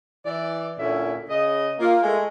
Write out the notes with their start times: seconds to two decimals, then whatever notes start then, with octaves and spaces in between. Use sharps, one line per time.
0.25 E3 D5
0.79 D2 A#2 C#4 E4 E5
1.29 C#3 D#5
1.79 A#3 F4
2.03 G#3 A3